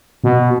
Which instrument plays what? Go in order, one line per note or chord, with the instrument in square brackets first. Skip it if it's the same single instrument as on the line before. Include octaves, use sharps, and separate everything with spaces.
[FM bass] B2